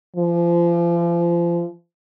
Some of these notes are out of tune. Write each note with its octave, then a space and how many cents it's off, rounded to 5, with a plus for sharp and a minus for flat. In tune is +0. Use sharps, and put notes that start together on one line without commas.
F3 -30